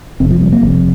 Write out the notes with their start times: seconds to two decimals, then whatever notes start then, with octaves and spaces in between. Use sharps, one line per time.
0.20 F1 F2 C3 C4
0.31 F3
0.42 G3
0.52 A#3
0.63 F1 F2 C3